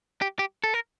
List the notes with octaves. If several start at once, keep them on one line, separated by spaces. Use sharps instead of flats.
G4
G4
A4
A#4